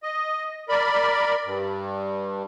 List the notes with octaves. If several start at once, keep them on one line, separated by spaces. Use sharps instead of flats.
D#5
A#4 D5 B5
G2